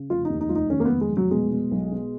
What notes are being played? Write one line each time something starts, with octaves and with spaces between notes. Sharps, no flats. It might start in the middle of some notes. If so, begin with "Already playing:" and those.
Already playing: C#3
F1 F4
D#2 D#4
D#4
F1 F4
D#4
D#3 C#4
A#3
B3
F1
G#3
F1
F#3
B2 G#3
B2
B1
B2